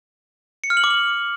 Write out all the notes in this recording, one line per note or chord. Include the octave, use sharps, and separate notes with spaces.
C#7
F6
F#7
D6
F#7